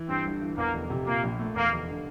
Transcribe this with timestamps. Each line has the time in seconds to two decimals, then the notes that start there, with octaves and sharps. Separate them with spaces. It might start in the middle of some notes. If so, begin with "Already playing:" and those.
Already playing: E3
0.09 G2 C4
0.25 G1
0.41 E3
0.57 E2 A#3
0.73 F1
0.90 C3
1.06 A#2 A#3
1.23 A#1
1.39 A3
1.56 E2 A#3
1.72 F1
1.89 D3